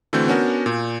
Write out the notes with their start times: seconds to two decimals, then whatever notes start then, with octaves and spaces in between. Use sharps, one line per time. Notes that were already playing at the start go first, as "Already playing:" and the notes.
0.13 D3 E3 A3 C4 F#4 G6
0.28 B3 C#4 D4 F#4 A#4
0.66 A#2